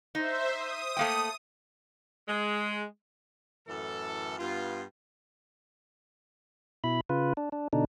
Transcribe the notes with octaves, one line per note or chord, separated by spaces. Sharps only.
D#4 C5 E5
D#6
A3 A#3 G5
G#3
F#2 A2 E3 A4
G2 B3 F4
B2 E4 B5
C#3 F4 B4
D4
D4
B2 D3 D4 D#4